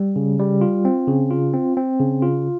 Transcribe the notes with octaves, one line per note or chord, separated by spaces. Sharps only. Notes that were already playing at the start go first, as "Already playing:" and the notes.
Already playing: G3
C#3
G3
F4
C4
C#3
F4
C4
C4
C#3
F4